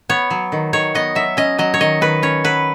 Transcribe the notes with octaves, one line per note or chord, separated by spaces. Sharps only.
B3 C#5
F#3
D#3
D#3 C#5
B3 D#5
F#3 E5
C#4 D#5
F#3 D#5
C#5
D#3 D#5
D#3 B4
C#4 C#5
F#3 B4